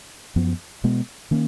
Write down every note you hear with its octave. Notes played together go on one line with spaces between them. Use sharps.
F#2 F3 B3
B2 G#3 B3
D#3 A#3 C#4